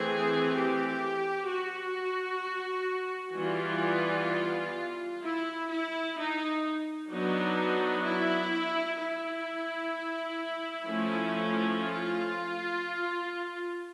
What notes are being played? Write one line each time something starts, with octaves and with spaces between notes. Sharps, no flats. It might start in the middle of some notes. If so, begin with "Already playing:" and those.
Already playing: E3 A3 C4 G#4
G4
F#4
E3 G3 B3 F4
E4
E4
D#4
F#3 B3 D4 D#4
E4
E4
F3 A3 C#4
F4